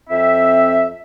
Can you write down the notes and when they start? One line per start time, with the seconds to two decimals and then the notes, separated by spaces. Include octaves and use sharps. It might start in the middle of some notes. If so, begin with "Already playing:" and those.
0.09 F2 C4 E5